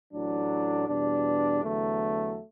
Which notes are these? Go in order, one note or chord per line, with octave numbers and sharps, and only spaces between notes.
A1 A2 F#3 D4
E2 B2 G3 D4
E2 D3 F#3 A3